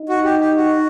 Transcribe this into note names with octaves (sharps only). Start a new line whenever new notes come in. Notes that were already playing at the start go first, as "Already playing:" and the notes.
Already playing: D#4
F#4
G4
G4
F#4